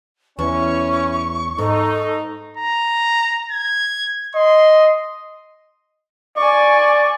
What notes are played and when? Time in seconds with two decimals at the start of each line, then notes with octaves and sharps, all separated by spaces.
0.39 E2 C#4 E4 C#6
1.58 G#2 D#4 A4
2.57 A#5
3.52 G#6
4.35 D#5 C6
6.37 D5 G#5 C#6